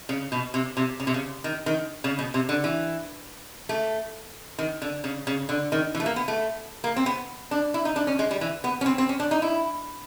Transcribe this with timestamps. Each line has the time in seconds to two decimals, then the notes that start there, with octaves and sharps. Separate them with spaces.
0.09 C#3
0.32 B2
0.54 C3
0.77 C3
1.00 C#3
1.07 C3
1.14 C#3
1.44 D#3
1.66 D#3
2.04 C#3
2.19 B2
2.34 C3
2.49 D3
2.64 E3
3.69 A3
4.59 D#3
4.82 D3
5.04 C#3
5.27 C#3
5.49 D3
5.72 D#3
5.94 E3
6.00 A3
6.06 A#3
6.16 B3
6.28 A3
6.84 A#3
6.96 C4
7.06 B3
7.51 D4
7.74 E4
7.85 D#4
7.96 D4
8.07 C#4
8.19 G#3
8.31 G3
8.41 E3
8.64 B3
8.81 C#4
8.86 C4
8.98 C4
9.09 C#4
9.20 D4
9.31 D#4
9.42 E4